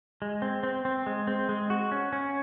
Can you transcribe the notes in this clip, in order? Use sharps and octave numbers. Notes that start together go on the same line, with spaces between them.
G#3
C4
C4
C4
G#3
C4
G#3
F#4
C#4
C#4